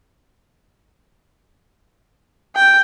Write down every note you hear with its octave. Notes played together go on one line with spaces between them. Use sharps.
G5